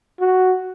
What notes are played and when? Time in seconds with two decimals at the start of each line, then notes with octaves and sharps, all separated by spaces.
0.20 F#4